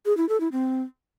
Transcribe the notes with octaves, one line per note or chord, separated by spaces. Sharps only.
G#4
E4
A4
E4
C4